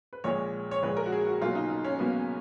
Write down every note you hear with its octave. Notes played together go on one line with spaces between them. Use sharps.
B4
A#1 A#2 G#3 C#5
C#5
A#1 A#2 G#3 B4
A#4
F#4
G#4
F#4
B1 B2 F#3 A#3 F4
D#4
D#4
C#4
B1 B2 F#3 A#3 B3